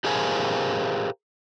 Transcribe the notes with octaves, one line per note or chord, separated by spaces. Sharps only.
G4 G#4 A#4 C5 F5 G#5